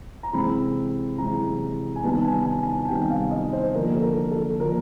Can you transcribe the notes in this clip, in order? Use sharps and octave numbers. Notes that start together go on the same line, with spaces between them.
A#5
C3 E3 G#3 C4 B5
C3 E3 G#3 C4 A#5
G#5
C3 D#3 G3 B3 A5
G#5
G#5
A5
C3 D#3 G3 B3 G5
F5
D#5
C5
D3 F3 A#3 A#4
A4
A#4
A4
D3 F3 A#3 A#4